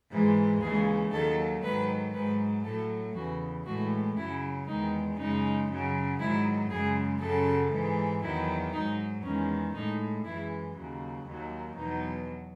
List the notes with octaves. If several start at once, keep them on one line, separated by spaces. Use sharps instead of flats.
G#2 E3 G#3
D#2 C#3 E3 G#3 G#4
D#2 D#3 F#3 A4
G#2 D#3 F#3 B4
G#2 F#3 B4
A2 F#3 A4
E2 C#3 E3 F#4
A2 E3 G#3 F#4
F#2 C#3 F#3 E4
E2 D#3 G#3 D#4
F#2 C#3 G#3 D#4
F#2 C#3 F#3
G#2 D#3 F#3 E4
F#2 C#3 G#3 G#4
F#2 C#3 F#3 A4
G#2 E3 G#3
E2 D#3 F#3 E4
G#2 F#3 D#4
E2 D#3 G#3 C#4
A2 G#3 D#4
F#2 E3 G#3 E4
D#2 C#3 F#3
D#2 D#3 F#3
E2 B2 F#3 D#4